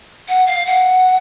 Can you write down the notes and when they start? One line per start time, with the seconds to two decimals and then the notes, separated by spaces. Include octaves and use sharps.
0.28 F#5
0.47 F5
0.66 F#5